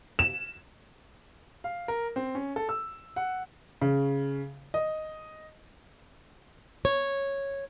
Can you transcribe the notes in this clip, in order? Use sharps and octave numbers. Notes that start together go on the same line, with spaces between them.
E7
F5
A#4
C4
C#4
A4
E6
F#5
C#3
D#5
C#5